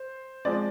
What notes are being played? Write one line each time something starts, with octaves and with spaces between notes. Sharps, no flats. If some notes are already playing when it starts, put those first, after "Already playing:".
Already playing: C5
F3 G#3 C4 D5